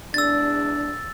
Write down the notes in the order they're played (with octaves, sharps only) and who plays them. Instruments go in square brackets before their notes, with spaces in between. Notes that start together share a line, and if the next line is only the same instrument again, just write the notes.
[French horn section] E2 G#3 D4 [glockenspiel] E6 A6